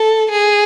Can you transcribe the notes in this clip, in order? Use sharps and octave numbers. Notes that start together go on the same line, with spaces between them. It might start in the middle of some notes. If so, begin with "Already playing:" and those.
Already playing: A4
G#4